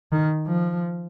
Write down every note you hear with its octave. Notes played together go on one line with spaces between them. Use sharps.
D#3
F3